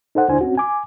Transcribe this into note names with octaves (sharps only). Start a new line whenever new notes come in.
D#4 A4 C5 F#5
D2 D4 E4 C5 G#5
C4 C#4 F#4
G#5 D6